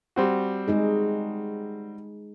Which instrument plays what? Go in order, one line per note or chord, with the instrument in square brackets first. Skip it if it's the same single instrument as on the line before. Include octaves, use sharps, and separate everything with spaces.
[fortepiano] G3 C4 F#4
[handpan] G#3 D#4 G#4